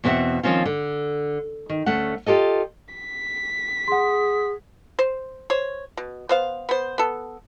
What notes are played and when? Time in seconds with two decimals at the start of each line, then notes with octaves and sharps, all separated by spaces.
0.04 E2 B2 C4 F#4 E5 F#5
0.43 D#3 F3 F#3 C4 C#4 F4
0.66 D3
1.69 D#3
1.86 D2 A3 C#4 F#5
2.26 F4 G4 A4 D#5
2.95 B6
3.88 G#4 F#5 C6
4.99 C5
5.50 C5 C#5
5.97 B2
6.29 B3 C5 F5
6.69 B3 C5
6.98 B3 A4